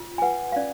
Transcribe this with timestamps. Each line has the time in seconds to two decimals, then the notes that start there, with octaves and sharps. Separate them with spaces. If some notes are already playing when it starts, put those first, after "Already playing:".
Already playing: F4
0.18 G#5
0.22 B4 F#5
0.52 F5
0.56 C#4 D5